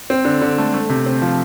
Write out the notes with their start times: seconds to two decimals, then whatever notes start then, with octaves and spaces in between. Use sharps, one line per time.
0.10 C4
0.25 D3
0.41 D3
0.58 A3
0.74 A3
0.89 C3
1.06 C4
1.22 F3